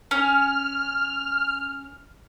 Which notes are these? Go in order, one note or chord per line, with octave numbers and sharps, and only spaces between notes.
C#4 F6